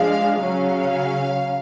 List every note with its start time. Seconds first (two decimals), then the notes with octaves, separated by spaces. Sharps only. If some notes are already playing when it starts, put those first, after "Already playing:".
Already playing: F3 G#3 D4 F5
0.42 C#3 F#3 C#4 F5